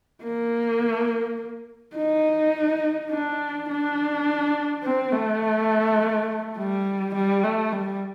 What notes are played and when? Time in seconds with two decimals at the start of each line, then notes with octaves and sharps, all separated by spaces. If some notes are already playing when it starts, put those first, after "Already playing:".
0.24 A#3
1.96 D#4
3.11 D4
3.69 D4
4.84 C4
5.12 A3
6.57 G3
7.14 G3
7.43 A3
7.72 G3